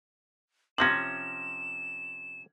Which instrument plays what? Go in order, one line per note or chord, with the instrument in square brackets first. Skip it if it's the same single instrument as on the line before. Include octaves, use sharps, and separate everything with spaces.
[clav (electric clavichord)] C3 F3 C#4 [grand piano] G#6 A#6 F#7 [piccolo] E7